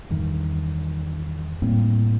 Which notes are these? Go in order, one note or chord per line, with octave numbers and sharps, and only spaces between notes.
E2 G2 D#3
A2 G3 A#3 C4